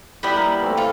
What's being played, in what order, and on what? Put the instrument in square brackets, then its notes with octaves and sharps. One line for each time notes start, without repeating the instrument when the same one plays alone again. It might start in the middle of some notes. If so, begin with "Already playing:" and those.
[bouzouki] G3 B3 E4 [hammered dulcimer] G4
[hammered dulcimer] A#3 A#4
E3 A3 C4
[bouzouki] F4 A4